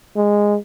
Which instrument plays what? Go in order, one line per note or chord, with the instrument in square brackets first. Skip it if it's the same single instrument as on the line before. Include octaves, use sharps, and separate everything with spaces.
[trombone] G#3